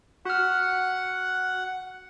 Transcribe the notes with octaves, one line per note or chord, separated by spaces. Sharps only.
F#4 F#5 F6